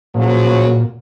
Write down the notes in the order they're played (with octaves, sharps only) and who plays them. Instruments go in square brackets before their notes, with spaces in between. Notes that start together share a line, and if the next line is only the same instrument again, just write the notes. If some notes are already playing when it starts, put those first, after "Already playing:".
[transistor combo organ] A#2 [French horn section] C#3 F3 F#3